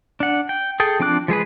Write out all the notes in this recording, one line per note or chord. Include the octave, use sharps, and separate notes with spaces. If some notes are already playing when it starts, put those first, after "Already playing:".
D4 F#5
G5
G#4 A4 G5
F3 C4 D4 D6 F#6
F3 G#3 G#4 B4